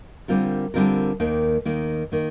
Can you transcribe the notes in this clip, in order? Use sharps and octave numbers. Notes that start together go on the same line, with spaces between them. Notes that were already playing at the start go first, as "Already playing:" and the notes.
D3 G3 C4 F4 A#4
D3 G3 C4 F4 A#4
D#2 D#3 A#3
D#2 D#3 A#3
D#3 A#3